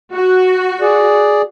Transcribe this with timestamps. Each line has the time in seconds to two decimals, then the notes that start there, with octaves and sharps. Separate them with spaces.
0.14 F#4
0.81 G#4 D5